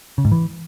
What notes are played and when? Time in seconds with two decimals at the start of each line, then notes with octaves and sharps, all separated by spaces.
0.18 C#3
0.25 G#2
0.32 E3